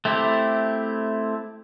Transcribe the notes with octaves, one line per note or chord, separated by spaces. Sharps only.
A3 C4 E4 G4